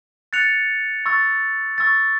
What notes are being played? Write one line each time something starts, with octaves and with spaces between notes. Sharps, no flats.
F#6 A6 C#7 F7
C#6 E6 A6
C#6 E6 A6